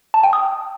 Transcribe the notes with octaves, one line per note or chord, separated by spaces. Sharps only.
A5
G5
D#6